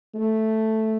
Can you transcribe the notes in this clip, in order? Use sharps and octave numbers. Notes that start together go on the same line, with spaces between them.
A3